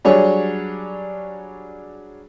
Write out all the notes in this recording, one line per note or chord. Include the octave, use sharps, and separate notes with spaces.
F#3 G3 D4 G#4 C#5